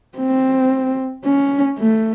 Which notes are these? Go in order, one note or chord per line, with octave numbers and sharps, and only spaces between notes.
C4
C#4
A3